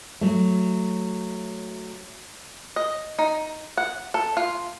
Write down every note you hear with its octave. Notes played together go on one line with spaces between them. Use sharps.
F#3 A3
D#5
D#4
F#5
A4
F4